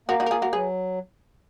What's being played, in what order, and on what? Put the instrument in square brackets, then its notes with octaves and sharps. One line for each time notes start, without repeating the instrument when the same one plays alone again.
[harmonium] A#3 [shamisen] F#4 A#4
[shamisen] D#4 F#4
A#4
F4 G#4
F#4 A#4
[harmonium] F#3 [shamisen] G#4 B4